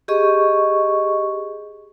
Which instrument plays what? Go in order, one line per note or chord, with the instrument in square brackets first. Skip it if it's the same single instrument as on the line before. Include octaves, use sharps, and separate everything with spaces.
[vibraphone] G4 G#4 D#5 C#6